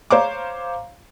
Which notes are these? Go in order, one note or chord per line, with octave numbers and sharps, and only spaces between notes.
C5 C#5 F5 A#5 D6